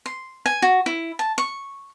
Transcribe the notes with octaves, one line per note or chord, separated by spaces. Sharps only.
C6
G#5
F#4
E4
A5
C#6